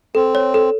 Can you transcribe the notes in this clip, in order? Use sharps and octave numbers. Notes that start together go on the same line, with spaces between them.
C4 A4
C#5
A4